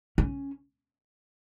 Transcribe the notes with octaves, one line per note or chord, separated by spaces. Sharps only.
C#4